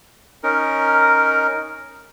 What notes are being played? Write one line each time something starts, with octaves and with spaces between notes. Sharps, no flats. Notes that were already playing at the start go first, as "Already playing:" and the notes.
C#4 D#4 A#4